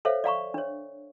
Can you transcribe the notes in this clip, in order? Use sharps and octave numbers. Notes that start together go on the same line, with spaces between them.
A4 C5 C#5 E5 F5
D5 F5 A#5 C#6
D4 C#5